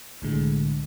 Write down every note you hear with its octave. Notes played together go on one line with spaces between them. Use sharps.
C2 A2 D3 G#3